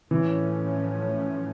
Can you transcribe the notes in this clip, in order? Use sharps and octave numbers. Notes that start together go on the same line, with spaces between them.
A2 E3 F3 A3 C#4